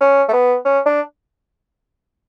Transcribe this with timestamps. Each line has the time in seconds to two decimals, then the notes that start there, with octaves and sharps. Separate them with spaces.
0.01 C#4
0.29 A3
0.33 B3
0.65 C#4
0.86 D4